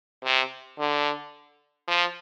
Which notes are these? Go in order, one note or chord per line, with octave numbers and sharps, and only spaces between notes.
C3
D3
F3